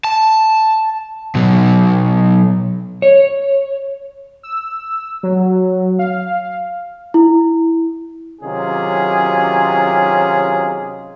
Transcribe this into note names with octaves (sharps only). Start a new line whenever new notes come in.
A5
B2 F#3
C#5
E6
F#3
F5
E4
C3 D#3 F#3 C#4 F4 G#4